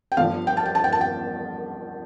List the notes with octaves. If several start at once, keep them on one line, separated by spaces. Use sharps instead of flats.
G5
G1 G2 F3 F5
G5
A5
G5
A5
G5
A5
G5